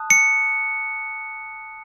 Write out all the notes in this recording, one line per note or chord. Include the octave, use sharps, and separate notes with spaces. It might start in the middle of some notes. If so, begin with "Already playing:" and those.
Already playing: A5 D#6 F#6
C#7